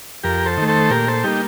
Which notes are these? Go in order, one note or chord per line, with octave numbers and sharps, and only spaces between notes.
F2 G4 A#4
A4 C5
D#3 A3
A4 C5
A#2 G4 A#4
A4 C5
G3 A#3 D#4 G4